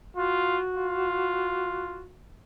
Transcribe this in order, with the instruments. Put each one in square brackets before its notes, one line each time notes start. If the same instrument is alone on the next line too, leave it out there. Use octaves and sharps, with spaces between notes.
[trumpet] F4 [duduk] F#4
[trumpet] F4